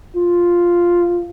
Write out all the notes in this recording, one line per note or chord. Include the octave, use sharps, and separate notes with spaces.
F4